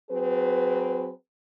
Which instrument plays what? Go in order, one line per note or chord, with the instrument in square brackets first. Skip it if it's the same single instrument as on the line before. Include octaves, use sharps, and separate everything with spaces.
[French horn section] F#3 C4 G#4 B4